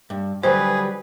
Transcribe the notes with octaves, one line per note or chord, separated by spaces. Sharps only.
G2
D3 F#3 G3 G#4 B4 C5